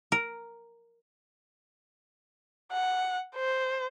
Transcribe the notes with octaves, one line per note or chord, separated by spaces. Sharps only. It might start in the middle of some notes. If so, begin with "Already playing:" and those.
A#4
F#5
C5